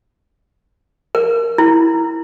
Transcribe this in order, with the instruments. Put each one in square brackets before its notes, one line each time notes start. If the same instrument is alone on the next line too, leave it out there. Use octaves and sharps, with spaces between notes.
[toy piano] A#4
E4